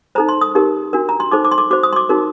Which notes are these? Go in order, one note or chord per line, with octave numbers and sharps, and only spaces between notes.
D#4 A4 C5 A#5
C6
D#6
D#4 G4 A#4
D4 F#4 A#4
A#5
C6
D#4 A4 C5 D6
D6
C6
D6
F#4 C5 D6
D#6
C6
D6
D#4 F#4 A#4